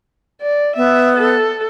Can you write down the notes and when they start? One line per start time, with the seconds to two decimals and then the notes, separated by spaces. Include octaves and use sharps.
0.41 D5
0.76 B3 E5
1.17 A4